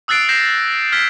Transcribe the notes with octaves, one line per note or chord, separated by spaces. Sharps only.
D#6 E6 F#6 A6 C7 D7
G6 A#6 C7 E7
F6 G#6 B6